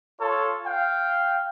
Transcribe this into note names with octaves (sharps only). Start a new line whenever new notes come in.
F4 A4 C#5 A5
F5 G5